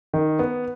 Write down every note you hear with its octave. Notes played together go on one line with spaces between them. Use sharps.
D#3
B3